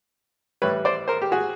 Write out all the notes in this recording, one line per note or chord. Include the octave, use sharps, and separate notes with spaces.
A2 E3 G3 B4 C#5
C5 D5
A#4 C5
G4
F#4 G#4